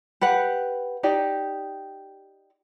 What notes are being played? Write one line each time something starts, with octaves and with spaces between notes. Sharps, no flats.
G4 B4 F#5
D#4 G4 D5